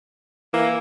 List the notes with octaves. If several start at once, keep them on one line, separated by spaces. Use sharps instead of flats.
E3 A#3